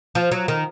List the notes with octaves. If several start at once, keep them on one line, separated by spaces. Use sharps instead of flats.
F3
F#3
D#3